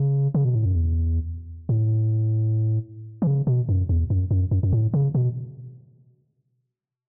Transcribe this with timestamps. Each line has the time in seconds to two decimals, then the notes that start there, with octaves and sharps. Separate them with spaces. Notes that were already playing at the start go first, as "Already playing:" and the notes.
Already playing: C#3
0.35 C#3
0.45 B2
0.55 A2
0.65 F#2
0.76 E2
1.69 A2
3.22 E3
3.27 C#3
3.47 B2
3.69 F#2
3.89 E2
4.10 F#2
4.31 F#2
4.51 F#2
4.63 F#2
4.73 A2
4.94 C#3
5.15 B2